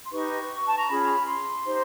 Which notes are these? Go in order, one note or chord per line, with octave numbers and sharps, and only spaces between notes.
C6
D#4 G4 B4 C#6
A5
A#5
C#4 F4 G#4 B5
C6
D#4 G4 C5